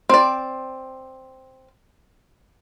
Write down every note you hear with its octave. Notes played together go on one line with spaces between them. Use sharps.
C4 D5